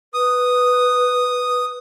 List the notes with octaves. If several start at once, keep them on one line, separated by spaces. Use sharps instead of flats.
B4 D#6